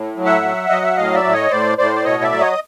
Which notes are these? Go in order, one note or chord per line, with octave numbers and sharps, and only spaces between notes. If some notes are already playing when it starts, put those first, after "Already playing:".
Already playing: A2
F#3
E5 F#5
F#3
F#3 D#5
E5
A2 D#5 F5
D5 E5
A2
C#5 D#5
A2 C5 D5
A2 C5 D5
D5
B2 C#5 D#5
D5 E5
F#3
C#5 D#5